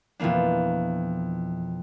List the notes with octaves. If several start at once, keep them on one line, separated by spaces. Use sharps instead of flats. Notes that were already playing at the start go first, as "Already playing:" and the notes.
F2 B2 E3 A#3 D4